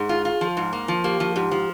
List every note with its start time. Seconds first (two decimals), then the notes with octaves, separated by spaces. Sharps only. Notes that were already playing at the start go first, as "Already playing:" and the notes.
Already playing: G#2 G#4
0.09 F4
0.25 F4
0.41 F3
0.57 G#2
0.73 A#3
0.88 F3
1.04 A#3 G4
1.20 F3
1.36 G#2 G4
1.51 F3